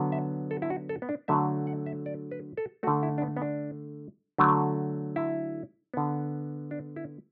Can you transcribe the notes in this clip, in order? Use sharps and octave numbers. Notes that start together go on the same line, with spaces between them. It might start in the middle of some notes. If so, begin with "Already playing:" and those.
Already playing: D3 F#3 B3
E5
A4
E4
F#4
A4
B3
D4
D3 F#3 A3 E5
F#5
E5
D5
B4
A4
D3 A3 F#4
E4
D4
B3
B3
D4
D3 F#3 A3
E4
D3 B3
D4
E4